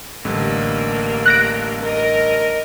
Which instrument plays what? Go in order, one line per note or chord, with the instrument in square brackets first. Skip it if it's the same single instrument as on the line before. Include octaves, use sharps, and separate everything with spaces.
[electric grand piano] A1 D3 G3 [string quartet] A#3
[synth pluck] F#6 A#6 D7
[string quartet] A#4 D#5